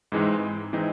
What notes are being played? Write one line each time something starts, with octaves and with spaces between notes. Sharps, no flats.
G#2 E3 G#3 C4 D#4
E3 G#3 C4 D#4